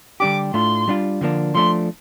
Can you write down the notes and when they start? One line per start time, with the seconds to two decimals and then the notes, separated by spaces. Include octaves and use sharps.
0.20 D3 G3 D4 G4 D6
0.54 A2 A3 D4 F4 C6
0.88 G3 D4 F4
1.21 D3 F3 A#3 D4
1.55 F3 A3 D4 C6